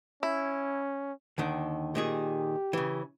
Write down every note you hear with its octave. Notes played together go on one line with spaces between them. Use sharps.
C#4 E4
D#2 D3 D#3
A#2 D#3 G4 G#4
C#3 E3